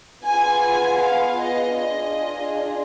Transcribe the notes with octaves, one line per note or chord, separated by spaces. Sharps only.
B3 F4 G#4 G#5
G#5
F5
D#5
D4 F4 G#4 D#5